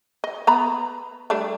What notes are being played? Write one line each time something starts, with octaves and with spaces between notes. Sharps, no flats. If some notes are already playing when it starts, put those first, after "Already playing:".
D#5
B3 A#5 B5
G3 A3 D4